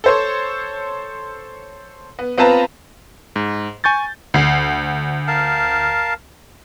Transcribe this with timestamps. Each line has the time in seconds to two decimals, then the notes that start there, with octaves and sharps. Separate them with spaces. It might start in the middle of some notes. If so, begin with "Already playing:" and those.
0.04 A4 C5 C#5
2.19 B3
2.38 B3 C4 F4 B4 A5 A#5
3.36 G#2
3.84 G#5 C#6 G6 A6
4.34 D2 C7
5.27 A#4 F5 A5